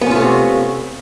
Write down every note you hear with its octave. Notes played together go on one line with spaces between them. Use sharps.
C3 A3 B3 C#4 F4